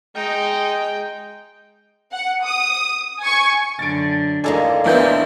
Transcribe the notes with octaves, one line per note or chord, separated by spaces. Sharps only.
G#3 D#4 G5
F#5
D#6
G#5 C#6
F#2 D3 A6 D7
A1 F2 A#3 D#4 G#4 A4 D5 G#5
F1 A#1 A#2 E3 B3 D4 E4 G6